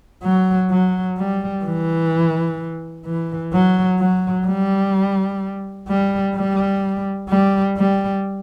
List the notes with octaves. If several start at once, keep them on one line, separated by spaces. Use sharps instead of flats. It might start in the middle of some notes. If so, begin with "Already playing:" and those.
F#3
F#3
G3
E3
E3
F#3
F#3
G3
G3
G3
G3
G3